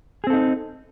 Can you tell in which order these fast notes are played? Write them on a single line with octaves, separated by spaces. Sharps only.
G#4 C4 A4 D#4